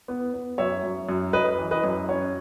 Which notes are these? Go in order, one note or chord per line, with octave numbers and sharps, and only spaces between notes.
B3
B3
F#2 C#5 E5
F#2
F#2
F#2 B4 D#5
E3
B4 D#5
F#2
C#4 C#5